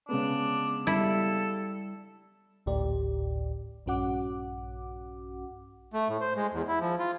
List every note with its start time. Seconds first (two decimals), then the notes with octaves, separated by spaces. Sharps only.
0.09 C#3 G#3 B3 D4
0.87 G3 E4 A4
2.66 G#1 D2 A2 G4 D5
3.86 A#1 G2 C#4 F#4 F#5 D6
5.93 A3
6.08 A2
6.21 C5
6.36 G#3
6.53 E2
6.68 E4
6.80 F3
6.99 F4